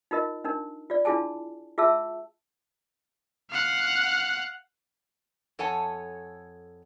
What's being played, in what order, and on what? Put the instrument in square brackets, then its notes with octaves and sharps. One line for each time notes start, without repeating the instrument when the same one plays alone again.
[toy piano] D#4 F4 A#4 D#5
D4 D#4 A#4
F4 D5
D4 E4 F4 G#4 G#5 A5
F4 G#4 E5 A5 E6
[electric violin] F5 F#5
[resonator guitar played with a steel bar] F2 A4 C#5 F#5 G#5 A5